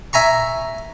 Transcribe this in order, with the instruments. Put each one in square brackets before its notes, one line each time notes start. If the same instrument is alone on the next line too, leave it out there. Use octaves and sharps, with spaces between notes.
[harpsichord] E5 G#5 A#5 C#6